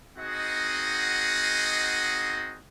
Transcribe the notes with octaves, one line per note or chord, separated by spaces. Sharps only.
C4 D#4 F#4 G#4 D#5 F#5